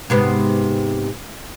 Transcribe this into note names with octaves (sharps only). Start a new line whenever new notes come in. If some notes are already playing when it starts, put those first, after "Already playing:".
G#2 C3 B3